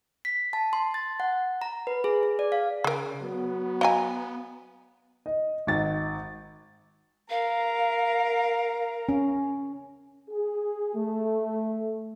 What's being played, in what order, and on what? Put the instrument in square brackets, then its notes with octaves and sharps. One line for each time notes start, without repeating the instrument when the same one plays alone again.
[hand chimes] B6
A5
C6
A6
F#5
A#5
B4
G#4
G#4
D5
F5
[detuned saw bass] C#3 [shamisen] G#4 A#4
[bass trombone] F#3 [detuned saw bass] B3
[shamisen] D#5 G#5 [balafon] F5 A#5
[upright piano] D#5
G#1 D#4 A6
[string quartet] A#4 [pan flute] F5
[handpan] C#4
[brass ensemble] G#4
A3